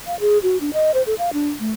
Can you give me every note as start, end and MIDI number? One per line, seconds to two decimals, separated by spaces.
0.07 0.19 77
0.20 0.38 68
0.43 0.60 66
0.61 0.70 62
0.73 0.92 75
0.94 1.02 72
1.06 1.14 69
1.19 1.30 77
1.33 1.49 62
1.60 1.71 57